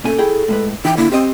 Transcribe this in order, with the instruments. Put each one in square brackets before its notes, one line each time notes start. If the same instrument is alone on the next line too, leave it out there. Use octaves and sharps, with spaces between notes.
[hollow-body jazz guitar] A#2 C#4 G#5 [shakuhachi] A4
[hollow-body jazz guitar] E4 G#4 G5
A2 G#3 B4
[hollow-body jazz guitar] E3 D#4 E4 [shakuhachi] G5
[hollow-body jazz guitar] D3 A#3 [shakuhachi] E4
[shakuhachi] C4 [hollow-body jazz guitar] G4 C5 D#5